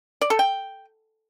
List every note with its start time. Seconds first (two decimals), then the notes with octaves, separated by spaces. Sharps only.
0.21 D5
0.30 A4
0.39 G5